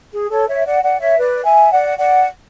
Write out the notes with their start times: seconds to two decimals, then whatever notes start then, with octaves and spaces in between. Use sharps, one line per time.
0.13 G#4
0.30 A4 C#5
0.48 C#5 E5
0.65 D5 F#5
0.83 D5 F#5
1.00 C#5 E5
1.18 B4 D5
1.45 E5 G#5
1.71 D5 F#5
1.98 D5 F#5